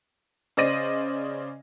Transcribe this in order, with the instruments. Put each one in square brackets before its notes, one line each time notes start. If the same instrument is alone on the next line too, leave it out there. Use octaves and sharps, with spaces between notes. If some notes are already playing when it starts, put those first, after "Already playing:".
[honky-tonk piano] C#3 C5 D5 D#5 A#6 D#7